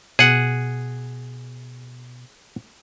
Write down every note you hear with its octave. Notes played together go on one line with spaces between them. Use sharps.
B2 G#4 F#5